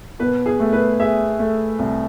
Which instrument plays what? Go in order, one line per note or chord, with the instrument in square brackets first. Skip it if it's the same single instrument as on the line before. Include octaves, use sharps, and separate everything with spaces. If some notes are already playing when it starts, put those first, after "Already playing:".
[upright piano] B2 [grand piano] B4
[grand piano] G#4
[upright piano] A3
[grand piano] B4
[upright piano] G#4 [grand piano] E5
[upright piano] A3
C2